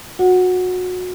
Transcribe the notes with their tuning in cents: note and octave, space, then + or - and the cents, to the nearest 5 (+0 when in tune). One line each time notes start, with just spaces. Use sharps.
F#4 -25 F#5 +0